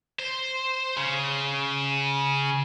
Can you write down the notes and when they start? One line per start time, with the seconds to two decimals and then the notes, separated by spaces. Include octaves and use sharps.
0.19 C5
0.97 C#3